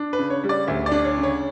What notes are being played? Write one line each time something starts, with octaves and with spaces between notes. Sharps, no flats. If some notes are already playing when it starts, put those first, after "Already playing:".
Already playing: D4
B4
C#3
C#5
G3
D5
D2 E5
D5
D4
C#5
C#3
C#5